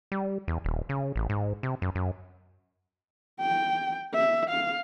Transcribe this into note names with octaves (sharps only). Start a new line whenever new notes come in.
G3
E2
D#1
C#3
A1
G#2
C3
F#2
F#2
G5
E5
F5